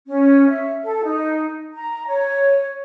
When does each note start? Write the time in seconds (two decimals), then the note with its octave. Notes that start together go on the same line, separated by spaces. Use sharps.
0.08 C#4
0.49 E5
0.84 A4
1.04 D#4
1.73 A#5
2.07 C#5